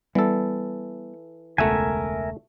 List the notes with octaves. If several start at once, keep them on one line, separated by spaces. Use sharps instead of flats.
E3 G3 B3 A4
E1 C#2 A3 A#4 E5 F#5 G#5